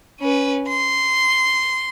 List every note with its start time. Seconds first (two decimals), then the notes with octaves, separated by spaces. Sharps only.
0.20 C#4 B4
0.68 C6